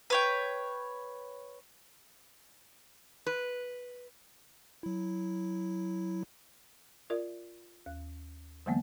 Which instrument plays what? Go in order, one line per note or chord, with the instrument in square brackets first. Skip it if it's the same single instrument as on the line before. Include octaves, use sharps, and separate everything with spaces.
[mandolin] B4 C#5 G5
[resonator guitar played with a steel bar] B4
[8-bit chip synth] F#3 E4
[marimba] F4 A#4 D5 E5
D#2
D3 E3 F#3 G#3 A#3 B3